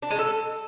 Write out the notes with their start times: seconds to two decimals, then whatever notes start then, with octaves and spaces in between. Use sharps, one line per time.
0.02 D4
0.11 G#3
0.19 A4